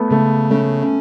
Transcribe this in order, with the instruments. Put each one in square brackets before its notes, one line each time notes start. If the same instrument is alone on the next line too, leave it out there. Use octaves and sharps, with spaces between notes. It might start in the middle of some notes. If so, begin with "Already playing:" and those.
Already playing: [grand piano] A3 B3
[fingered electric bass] C#3 [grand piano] A3
[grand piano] A3 [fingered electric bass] C#4